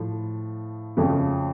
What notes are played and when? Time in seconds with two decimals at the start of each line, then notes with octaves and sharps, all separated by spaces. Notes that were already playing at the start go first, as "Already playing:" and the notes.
Already playing: A2 F3
0.97 F2 C#3 F3 A3 C#4